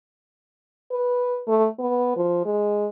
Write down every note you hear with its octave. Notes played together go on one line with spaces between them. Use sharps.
B4
A3
B3
F3
G#3